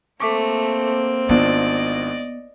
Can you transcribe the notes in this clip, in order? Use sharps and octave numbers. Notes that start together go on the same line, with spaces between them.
A3 A#3 C4 C#6 D6 B6
G#1 B3 D4 F4 D5 D#5